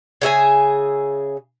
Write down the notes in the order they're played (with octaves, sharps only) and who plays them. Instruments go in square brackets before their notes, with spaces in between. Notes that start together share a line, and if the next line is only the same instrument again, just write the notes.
[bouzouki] C#3 G#4 E5 G#5